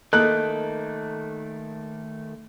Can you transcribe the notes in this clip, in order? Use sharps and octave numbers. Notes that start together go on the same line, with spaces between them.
D#3 A3 A#3 A4 D#5 F#6